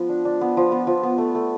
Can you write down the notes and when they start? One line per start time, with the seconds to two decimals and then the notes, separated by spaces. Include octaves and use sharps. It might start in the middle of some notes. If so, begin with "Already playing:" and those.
Already playing: F3 B3
0.09 D4
0.25 D4
0.41 B3
0.57 F3
0.72 B3
0.87 F3
1.03 B3
1.18 A3
1.35 A3